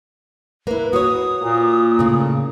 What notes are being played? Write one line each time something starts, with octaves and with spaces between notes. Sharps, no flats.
A#3 E4 B4
F#4 C#5 D#6
A#2 A#3
A2 C#3